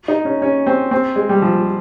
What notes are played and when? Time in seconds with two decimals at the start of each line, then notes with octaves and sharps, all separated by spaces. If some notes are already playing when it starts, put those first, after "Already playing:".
0.08 D#4
0.25 C#4
0.42 C#4
0.67 C4
0.91 C4
1.16 G#3
1.29 G3
1.42 F3